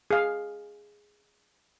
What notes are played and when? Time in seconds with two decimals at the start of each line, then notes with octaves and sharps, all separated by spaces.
0.11 G#4 F5